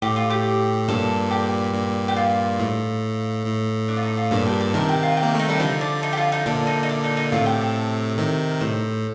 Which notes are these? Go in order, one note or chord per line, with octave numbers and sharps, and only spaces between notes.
A2 G4
F4
G4
G2 A#2 A4
G4
G2 A#2
G4
F4
A2
A2
D4
F4
D#4
F4
G2 A#2 A4
G4
A#4
A4
C3 D#3 A#4
G4
F4
G4
A#3
A3 D#4
G3 D#4
D3 F3 D#4
D4
D#4
G4
F4
D#4
A#2 D3 D4
D#4
D#4
D4
D#4
D#4
A2 C3 F4
G4
A4
C3 D#3
A#4
A2 C5